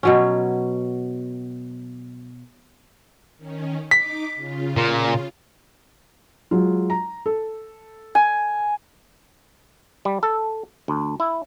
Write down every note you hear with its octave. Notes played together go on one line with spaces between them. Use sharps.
B2 F#3 C#4
D#3 C#4
D#4 D6 B6
C#3 F4
A#2
F#3 G#3 F4
A#5
A4
G#5
G3
A4
D2
E4